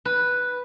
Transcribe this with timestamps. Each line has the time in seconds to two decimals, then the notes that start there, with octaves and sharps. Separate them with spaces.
0.05 B4